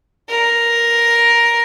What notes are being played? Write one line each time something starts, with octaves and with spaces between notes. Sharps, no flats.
A#4